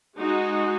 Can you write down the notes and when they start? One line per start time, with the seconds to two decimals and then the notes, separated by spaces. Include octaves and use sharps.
0.18 G#3 D#4 F#4